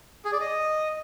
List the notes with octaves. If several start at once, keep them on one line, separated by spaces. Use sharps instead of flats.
G#4
D5
D#5